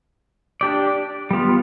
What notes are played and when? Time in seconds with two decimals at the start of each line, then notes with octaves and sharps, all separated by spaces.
0.61 D4 G4 D5
1.31 G3 B3 F4